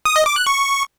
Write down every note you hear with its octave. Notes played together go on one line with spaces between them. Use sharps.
D#6
D#5
D6
F#6
C#6